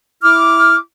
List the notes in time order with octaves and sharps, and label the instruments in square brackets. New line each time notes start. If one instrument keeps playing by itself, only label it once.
[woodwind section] E4 D6 F6